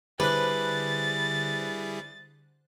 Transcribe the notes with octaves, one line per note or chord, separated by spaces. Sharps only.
D3 G3 E4 G#4 B4 C5 F#6 A6